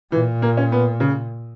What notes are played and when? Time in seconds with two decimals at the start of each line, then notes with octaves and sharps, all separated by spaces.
0.12 A#2 E3
0.42 A#3
0.57 C#4
0.72 B3
1.00 C#3